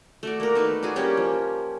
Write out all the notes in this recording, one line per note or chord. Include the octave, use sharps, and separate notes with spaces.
A3 F#4 D5
A#3 A#4
A3 D#4 B4
D4 F#4 G#4
G3 A#3 C#4 G4
F3